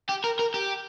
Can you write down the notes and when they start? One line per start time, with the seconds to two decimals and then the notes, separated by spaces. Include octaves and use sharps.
0.09 G4
0.24 A#4
0.39 A#4
0.54 G4